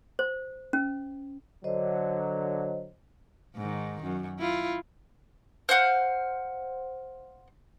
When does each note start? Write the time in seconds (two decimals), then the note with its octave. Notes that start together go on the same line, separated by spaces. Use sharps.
0.19 C5
0.73 C#4
1.64 D3 F#3 C5 D#5
3.56 G#2 D#3
4.03 F#2
4.40 E4 F4
5.69 C5 F5 F#5 G6